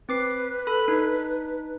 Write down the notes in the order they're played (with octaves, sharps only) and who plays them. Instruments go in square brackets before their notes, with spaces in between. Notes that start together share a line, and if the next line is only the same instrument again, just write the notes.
[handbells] C4 D6 C7 [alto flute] B4
[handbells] A4 B5
D4 D#4